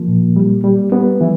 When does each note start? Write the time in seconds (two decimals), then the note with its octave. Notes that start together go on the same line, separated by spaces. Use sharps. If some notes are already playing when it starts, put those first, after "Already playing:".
Already playing: F3 A#3
0.08 A#2
0.36 G3
0.64 G3
0.92 G3 B3
1.21 E3